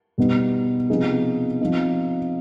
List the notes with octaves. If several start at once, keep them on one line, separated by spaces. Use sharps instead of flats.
B2 G3 B3 D#4
C3 F3 B3 D#4 G#4
F3 C4 D#4